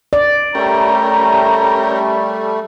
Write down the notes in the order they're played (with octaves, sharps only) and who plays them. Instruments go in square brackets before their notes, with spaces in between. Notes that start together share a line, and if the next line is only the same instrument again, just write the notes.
[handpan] D5
[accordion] G3 A3 [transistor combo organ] C#4 G4 A#4 [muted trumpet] A#5